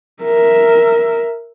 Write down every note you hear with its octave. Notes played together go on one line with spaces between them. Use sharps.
A#4 E5